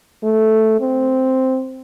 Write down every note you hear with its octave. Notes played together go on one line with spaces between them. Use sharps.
A3
C4